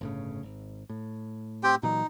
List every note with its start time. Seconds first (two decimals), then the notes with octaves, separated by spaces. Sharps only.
0.01 G1 A2 C#3
0.43 G#1
0.89 A2
1.63 C4 G4 G5
1.83 A#2 E3 F#3 D#4